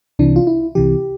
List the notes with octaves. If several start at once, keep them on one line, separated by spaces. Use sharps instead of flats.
C2 C3 E3 D4
F4
E4
C2 C3 E3 G4